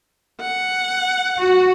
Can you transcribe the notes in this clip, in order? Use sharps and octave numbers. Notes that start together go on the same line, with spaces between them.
F#5
F#4